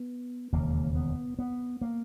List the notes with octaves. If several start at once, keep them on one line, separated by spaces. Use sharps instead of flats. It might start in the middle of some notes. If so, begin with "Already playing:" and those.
Already playing: B3
E1 D#2 C#3 A#3
B3
B3
A#3